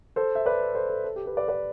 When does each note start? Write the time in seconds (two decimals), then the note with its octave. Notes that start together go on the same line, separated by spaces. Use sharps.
0.16 A4 C5
0.35 E5
0.46 B4 D5
0.75 A4 C5
0.90 A4
1.04 A4
1.16 G4
1.26 G4 B4
1.37 B4 D5
1.48 B4 D5